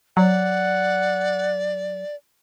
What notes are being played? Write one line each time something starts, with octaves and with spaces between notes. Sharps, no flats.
F#3 D5 F#5